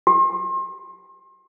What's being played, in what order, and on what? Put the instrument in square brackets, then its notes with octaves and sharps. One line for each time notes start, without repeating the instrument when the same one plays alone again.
[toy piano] G4